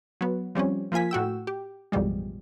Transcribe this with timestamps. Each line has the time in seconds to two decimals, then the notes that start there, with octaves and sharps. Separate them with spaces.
0.21 F#3 B3
0.55 F3 G3 C4 C#4
0.92 F3 A#3 F4 G#5 B6
1.11 A2 F#4 G5 E6
1.47 G4
1.92 A1 F2 B2 F3 G3 G#3